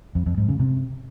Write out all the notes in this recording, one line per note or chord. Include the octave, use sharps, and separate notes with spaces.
F2
F2
G#2
C#3
C3